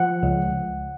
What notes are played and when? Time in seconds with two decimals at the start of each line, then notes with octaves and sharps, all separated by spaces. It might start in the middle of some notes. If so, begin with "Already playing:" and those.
Already playing: F3 F#5
0.23 C#2